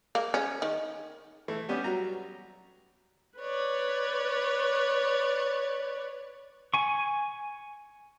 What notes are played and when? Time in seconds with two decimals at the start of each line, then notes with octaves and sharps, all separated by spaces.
0.15 A#3
0.34 C#4
0.62 D#3
1.48 E3 A3
1.69 G3 B3 C#4 G4
1.84 F#3 A#5
3.39 B4 C#5 D5
6.74 G#5 C#6